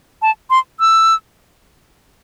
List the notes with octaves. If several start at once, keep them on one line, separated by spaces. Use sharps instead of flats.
A5
C6
E6